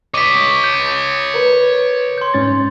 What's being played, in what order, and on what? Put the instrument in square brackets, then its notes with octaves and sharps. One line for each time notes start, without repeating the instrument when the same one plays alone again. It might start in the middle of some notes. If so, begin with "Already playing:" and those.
[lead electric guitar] C#5 D#5 [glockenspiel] D6 B6
[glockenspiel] G6
[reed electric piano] A#4 B4
[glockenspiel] C6 G6
[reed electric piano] G#2 C#4 A6